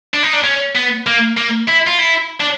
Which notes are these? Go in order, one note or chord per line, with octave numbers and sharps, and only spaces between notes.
D4
D#4
D4
C#4
B3
A#3
A#3
E4
F4
E4
D4